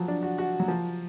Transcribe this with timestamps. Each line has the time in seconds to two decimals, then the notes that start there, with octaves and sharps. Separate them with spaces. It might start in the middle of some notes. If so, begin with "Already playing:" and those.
Already playing: F3 F#3
0.08 D4
0.23 F#4
0.38 F#4
0.59 F#3
0.68 F3